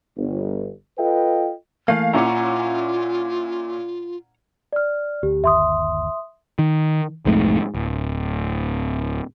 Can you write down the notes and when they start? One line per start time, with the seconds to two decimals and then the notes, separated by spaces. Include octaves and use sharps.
0.16 G1
0.97 F4 A4 B4 D#5 F5 G5
1.88 E3 A3 A#3 F5
2.13 A#2 C#4 E4 F4 F#5 A#5
4.73 D5 F6
5.23 D2 G4
5.44 G1 D#2 E5 C6 D#6
6.59 D#3
7.25 B1 F2 G#2 A3
7.75 D1